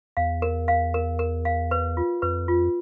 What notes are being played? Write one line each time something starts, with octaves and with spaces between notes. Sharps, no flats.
E2 F5
A#4
F5
A#4
A#4
F5
B4
F4
F2 B4
F4